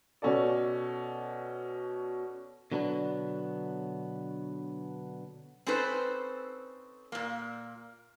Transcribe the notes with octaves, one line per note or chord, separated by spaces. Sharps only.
B2 C#4 A4 D5
B2 D3 F#3 B3 C#4 D4
C4 C#4 D#4 A4 B4 C5
A#2 A#3